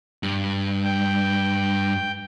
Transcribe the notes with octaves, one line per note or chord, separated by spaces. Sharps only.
G2
G5